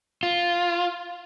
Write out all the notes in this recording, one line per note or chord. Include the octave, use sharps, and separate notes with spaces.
F4